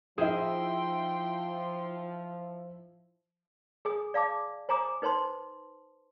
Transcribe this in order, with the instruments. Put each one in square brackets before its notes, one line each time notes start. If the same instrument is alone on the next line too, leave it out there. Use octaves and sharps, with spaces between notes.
[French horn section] F3 [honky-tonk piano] D#4 E4 [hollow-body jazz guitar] G#4 C5 F5 [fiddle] G5 C6
[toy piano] G#4 G#5 D#6
D5 F5 A5 D6
C5 G#5 A#5 D6 D#6
D#4 B4 C5 A5 C6